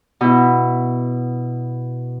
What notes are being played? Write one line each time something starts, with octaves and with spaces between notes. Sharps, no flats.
B2 E4